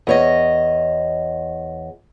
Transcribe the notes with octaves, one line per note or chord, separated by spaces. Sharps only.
E2 C#5 D#5